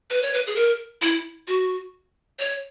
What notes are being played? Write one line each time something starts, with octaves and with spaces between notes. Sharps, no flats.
B4
C#5
B4
G#4
A#4
E4
F#4
C#5